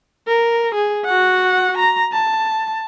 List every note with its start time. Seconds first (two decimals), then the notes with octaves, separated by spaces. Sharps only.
0.27 A#4
0.75 G#4
1.05 F#4 F#5
1.78 A#5
2.13 A5